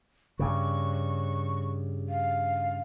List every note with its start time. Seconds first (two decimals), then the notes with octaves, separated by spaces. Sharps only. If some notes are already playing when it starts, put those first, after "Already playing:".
0.39 G2 C#3 C#6
2.09 F5